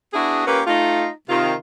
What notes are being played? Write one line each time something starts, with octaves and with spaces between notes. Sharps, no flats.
B3 D4 E4 F#4 G#4
A#3 C#4 F4 G4 A#4 B4
A3 D#4 F4
C3 D#3 F4